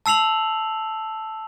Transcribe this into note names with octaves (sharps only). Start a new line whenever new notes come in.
A5 E6 C7 F7 F#7